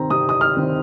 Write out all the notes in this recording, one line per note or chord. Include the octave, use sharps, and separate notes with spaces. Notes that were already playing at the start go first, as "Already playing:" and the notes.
Already playing: C3 D#3 C4 A#5
C3 D#6
D#6
F6
D#3 C4